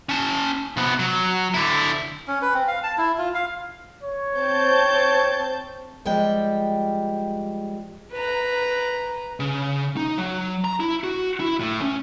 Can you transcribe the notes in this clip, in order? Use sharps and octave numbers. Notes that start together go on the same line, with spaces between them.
C#4 A5
C3 B3
F#3
D3 E4
C#4
B4
C4
F5
A5
E4
F4
F5
C#5
C4 A5 G6
F3 G3 G#3 G5
B4 A#5
C#3
D#4
F#3
A#5
E4
F#4
E4
A2
C#4